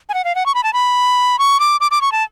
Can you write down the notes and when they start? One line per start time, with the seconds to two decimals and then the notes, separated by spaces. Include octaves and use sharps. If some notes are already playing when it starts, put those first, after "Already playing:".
0.09 G#5
0.14 F#5
0.25 F5
0.35 F#5
0.46 C#6
0.55 B5
0.64 A5
0.73 B5
1.39 C#6
1.60 D6
1.81 D6
1.91 D6
2.01 C#6
2.12 A5